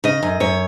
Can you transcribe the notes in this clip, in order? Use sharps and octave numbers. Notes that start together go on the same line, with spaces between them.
C#3 D#5
F#2
F#2 C#5